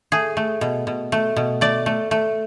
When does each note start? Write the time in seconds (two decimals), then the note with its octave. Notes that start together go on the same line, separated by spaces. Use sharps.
0.12 A3 G#4
0.37 A3
0.61 B2
0.87 B2
1.12 A3
1.36 B2
1.61 A3 D5
1.86 A3
2.11 A3